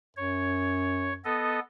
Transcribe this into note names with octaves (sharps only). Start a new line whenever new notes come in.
F#2 C#5
B3 A4 D#5